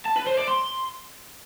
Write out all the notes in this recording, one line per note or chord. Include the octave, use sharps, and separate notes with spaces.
A5
B4
C5
D5
C6